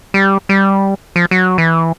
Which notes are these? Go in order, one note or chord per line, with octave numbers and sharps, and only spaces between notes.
G3
G3
F3
F#3
E3